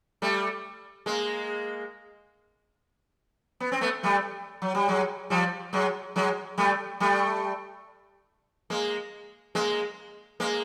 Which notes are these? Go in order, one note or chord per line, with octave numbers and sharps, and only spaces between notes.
G3 A3
G#3 A#3
B3
C4
A3 B3
G3 A3
F#3
G3
F#3 G#3
F3 G3
F#3 G#3
F#3 G#3
G3 A3
G3 A3
G#3 A#3
G#3 A#3
G#3 A#3